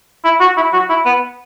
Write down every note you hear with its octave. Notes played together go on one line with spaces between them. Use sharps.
E4
F#4
E4
F#4
E4
B3